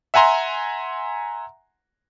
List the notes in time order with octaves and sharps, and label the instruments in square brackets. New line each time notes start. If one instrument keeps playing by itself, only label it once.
[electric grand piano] E5 F#5 G#5 A#5 C6